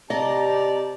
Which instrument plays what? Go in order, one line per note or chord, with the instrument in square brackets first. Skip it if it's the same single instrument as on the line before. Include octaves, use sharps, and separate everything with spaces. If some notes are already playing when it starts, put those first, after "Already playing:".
[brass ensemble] C3 G4 A5 [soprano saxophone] D5 [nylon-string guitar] D#5 [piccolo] A#5